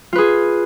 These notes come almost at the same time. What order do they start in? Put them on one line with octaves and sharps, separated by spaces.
F4 B4 G#4